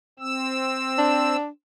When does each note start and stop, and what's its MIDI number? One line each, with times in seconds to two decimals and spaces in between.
0.19 1.36 60
0.19 1.36 88
0.98 1.47 62